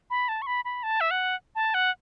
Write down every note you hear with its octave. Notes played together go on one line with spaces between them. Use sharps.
B5
A5
C#6
B5
B5
A5
E5
F#5
A5
F#5